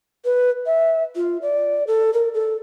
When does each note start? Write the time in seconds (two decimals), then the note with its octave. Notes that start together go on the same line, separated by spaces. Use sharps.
0.25 B4
0.66 E5
1.16 F4
1.42 D5
1.87 A4
2.13 A#4
2.34 A4